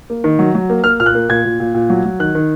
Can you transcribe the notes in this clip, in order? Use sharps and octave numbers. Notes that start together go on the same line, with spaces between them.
A#3
D#3
F#3
F#3
A#3
A#3 F6
A#2 F6
F#6
A#3
A#2 G#6
A#2
A#2
A#2
F#3
F#3
D#3 F#6
D#3